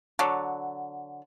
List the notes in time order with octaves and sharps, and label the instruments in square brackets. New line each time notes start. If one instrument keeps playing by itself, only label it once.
[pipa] D3 F#3